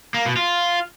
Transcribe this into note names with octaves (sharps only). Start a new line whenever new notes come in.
A#3
B2
F4